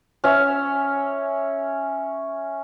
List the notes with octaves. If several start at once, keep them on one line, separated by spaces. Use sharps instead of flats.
C#4 C#5 E5